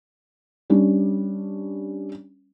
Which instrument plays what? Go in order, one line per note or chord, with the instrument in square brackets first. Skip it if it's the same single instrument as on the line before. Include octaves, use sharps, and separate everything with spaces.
[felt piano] G3 C#4 D4